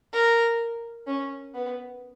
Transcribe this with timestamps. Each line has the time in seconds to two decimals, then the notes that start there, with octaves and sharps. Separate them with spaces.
0.13 A#4
1.07 C#4
1.54 B3